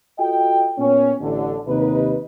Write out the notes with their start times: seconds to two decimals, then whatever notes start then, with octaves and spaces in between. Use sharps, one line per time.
0.18 F4 F#4 A4 D#5 G5
0.78 A#2 B3 C#4
1.20 A1 D3
1.67 D#2 C3 D#4 B4